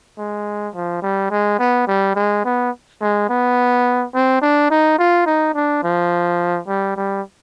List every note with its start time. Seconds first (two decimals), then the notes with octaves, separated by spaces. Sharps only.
0.18 G#3
0.75 F3
1.02 G3
1.31 G#3
1.59 B3
1.88 G3
2.15 G#3
2.45 B3
3.01 G#3
3.29 B3
4.14 C4
4.42 D4
4.71 D#4
4.99 F4
5.26 D#4
5.55 D4
5.83 F3
6.68 G3
6.96 G3